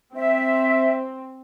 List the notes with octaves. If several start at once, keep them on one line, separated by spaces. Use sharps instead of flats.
C4 E5